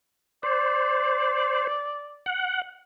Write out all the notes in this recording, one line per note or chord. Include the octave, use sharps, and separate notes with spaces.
C5 D5
F#5